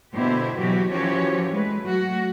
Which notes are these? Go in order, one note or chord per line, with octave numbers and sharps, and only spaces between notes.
B2 D3 E4 G4 C5
B2 E3 F#3 F#4 G4
E3 F3 C#4 F#4 G4 C#5
G#3 A3 B4
F#3 A3 F#4